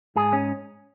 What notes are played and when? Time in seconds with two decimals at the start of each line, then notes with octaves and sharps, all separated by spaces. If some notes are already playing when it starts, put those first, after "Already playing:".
0.16 G#2 G#4
0.33 C#4